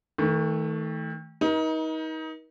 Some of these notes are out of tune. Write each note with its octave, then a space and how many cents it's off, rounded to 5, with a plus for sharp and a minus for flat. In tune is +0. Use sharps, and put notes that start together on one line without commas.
D#3 +40 A3 +0
D#4 +25 A#4 +45